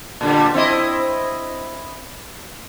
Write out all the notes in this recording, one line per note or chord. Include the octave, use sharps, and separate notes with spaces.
A#2 D3 G3
C4 E4 D#5